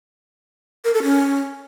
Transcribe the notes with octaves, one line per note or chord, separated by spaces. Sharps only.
A#4
A4
C#4